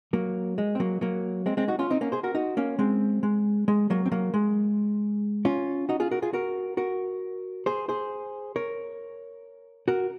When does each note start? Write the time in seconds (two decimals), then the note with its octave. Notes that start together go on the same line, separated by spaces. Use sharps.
0.13 F#3 A#3
0.58 G#3
0.75 C4
0.80 F#3 A#3
1.01 F#3 A#3
1.46 G#3 C4
1.57 G#3 C4
1.68 D#4 F#4
1.79 C#4 F4
1.90 C4 D#4
2.01 A#3 C#4
2.12 G#4 C5
2.23 F#4 A#4
2.35 D#4 F#4
2.57 A#3 C#4
2.79 G#3 C4
3.23 G#3
3.68 G#3
3.90 F#3 A#3
4.06 C4
4.12 F#3 A#3
4.34 G#3
5.45 C#4 F4
5.89 D#4 F#4
6.00 F4 G#4
6.11 F#4 A#4
6.22 F4 G#4
6.33 F#4 A#4
6.77 F#4 A#4
7.66 G#4 C5
7.89 G#4 C5
8.56 A#4 C#5
9.88 F#4 A#4